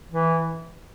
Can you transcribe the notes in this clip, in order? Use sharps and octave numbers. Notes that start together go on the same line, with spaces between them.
E3